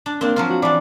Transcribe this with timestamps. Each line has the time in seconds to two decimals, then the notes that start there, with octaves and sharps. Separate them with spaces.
0.06 D4
0.21 A#3 C4 D4
0.36 F3 F#3 F4
0.50 F#4
0.62 E3 D4 D5